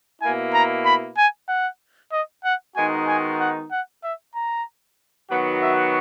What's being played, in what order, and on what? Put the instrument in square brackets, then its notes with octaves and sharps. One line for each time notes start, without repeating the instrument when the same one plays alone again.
[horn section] B2 A#3 E4 [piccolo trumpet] G#5
[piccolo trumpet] A#5
B5
G#5
F#5
D#5
F#5
[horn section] D#3 G#3 B3 D#4 F#4 [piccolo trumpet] G#5
[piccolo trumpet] G#5
F#5
F#5
E5
A#5
[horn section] D#3 F#3 B3 F#4 [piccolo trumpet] F#5
[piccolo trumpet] E5